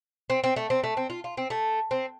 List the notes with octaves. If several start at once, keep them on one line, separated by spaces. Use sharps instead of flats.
C4
C4
A3
C4
A3
C4
F4
F4
C4
A3
C4